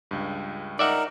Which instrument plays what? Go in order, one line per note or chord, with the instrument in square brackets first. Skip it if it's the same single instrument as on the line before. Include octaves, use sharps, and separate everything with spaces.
[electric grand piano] C#2 G2
[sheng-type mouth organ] D#4 A#4 [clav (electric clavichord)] D5 E5 F#5